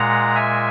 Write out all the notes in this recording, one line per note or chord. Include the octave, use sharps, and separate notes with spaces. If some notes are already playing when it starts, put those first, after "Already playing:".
Already playing: A#2 G#3 F#5 A#5
E5 G#5